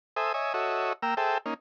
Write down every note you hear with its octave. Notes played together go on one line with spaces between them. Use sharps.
A4 C5 E5 G#5 D#6
C#5 D#5 E5 G#5
F#4 A4 C#5 D#5 E5
A#3 G5 A#5 E6
G#4 A4 C5 E5 G5 A5
A#3 C#4 D#4